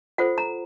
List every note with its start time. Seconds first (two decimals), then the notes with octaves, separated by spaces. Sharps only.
0.18 F4 A4 C5 F#5
0.38 A#5